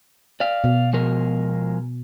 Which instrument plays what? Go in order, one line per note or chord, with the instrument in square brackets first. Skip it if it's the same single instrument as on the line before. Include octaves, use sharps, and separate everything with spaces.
[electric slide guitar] D5 F5
[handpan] B2
[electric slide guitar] F3 G#3 A#4